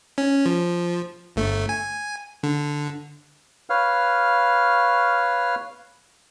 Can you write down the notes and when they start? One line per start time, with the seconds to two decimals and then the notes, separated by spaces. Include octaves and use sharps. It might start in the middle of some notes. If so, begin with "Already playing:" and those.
0.18 C#4
0.46 F3
1.36 G1 A3
1.69 G#5
2.43 D3
3.70 B4 C#5 F5 F6